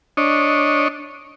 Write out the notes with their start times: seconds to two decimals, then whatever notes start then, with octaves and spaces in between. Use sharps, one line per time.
0.17 D4 C#5 D#5